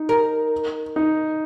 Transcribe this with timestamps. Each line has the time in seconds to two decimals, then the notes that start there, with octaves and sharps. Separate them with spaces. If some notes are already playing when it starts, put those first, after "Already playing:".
Already playing: D#4
0.09 A#4
0.96 D#4